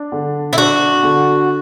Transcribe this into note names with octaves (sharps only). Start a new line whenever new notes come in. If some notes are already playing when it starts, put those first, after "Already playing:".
Already playing: D4
D3
E4
D4 F#4
D3